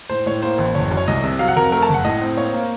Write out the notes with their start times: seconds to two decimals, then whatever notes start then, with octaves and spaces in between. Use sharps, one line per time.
0.10 A2 C5
0.26 A2 C#5
0.42 A#3 C5
0.58 A1
0.75 F#1 C#5
0.91 F#2
0.97 C#5
1.08 C2 D#5
1.24 C3
1.39 F#3 F5
1.48 F#5
1.56 F2 A#4
1.72 A3 A#4
1.82 A5
1.89 F#1 F#5
2.04 A2 D#5
2.22 C4
2.37 A#3 C#5
2.54 A#3